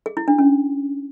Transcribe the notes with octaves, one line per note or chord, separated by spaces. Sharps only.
G#4
E4
D4
C#4